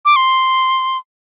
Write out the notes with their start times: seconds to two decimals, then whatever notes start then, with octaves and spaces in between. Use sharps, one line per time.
0.05 D6
0.16 C6